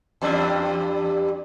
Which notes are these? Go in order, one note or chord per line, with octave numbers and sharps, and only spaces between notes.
E2 G2 D4